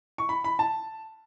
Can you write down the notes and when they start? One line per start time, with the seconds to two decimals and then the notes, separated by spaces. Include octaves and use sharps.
0.18 C#6
0.29 B5
0.44 B5
0.59 A5